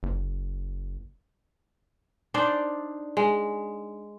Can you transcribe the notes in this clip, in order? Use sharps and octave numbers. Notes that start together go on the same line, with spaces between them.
F#1
D4 D#4 C5 D5
G#3